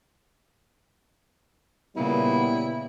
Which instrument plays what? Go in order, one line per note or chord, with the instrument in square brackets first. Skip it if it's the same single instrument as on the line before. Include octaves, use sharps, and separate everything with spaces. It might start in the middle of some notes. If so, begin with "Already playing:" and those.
[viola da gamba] A#2 C#3 [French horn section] G3 B3 [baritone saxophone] E4